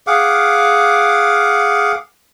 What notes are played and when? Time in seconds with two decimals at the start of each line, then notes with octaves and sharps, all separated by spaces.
0.07 G#4 F5 F#5 D6